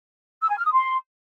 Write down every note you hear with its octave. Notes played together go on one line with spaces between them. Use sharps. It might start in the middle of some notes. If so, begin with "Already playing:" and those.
E6
G#5
F6
D#6
C6